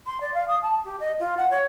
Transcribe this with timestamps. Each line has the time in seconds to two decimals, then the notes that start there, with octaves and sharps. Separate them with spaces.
0.06 C6
0.21 D5
0.34 F5
0.48 D#6
0.62 A5
0.85 G4
1.00 D#5
1.20 F4
1.37 F#5
1.51 C#5